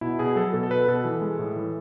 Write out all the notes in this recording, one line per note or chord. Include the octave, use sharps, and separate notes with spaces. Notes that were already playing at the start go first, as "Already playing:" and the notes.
B2 E4
B2 G#4
F#3 A4
B2 A4
A4
B2 B4
B2 A4
E3
G#3
A2
E3